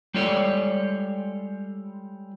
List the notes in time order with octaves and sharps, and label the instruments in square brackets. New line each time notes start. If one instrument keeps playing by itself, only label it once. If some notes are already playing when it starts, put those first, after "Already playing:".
[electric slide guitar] G3 G#3 F4 A4 C#5 D5